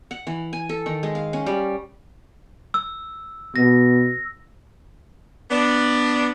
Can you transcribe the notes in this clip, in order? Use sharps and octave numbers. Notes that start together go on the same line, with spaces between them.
F#5
E3
G#5
A4
D#3
G#3
F5
C#4
G3
E6
B2 A#6
B3 D4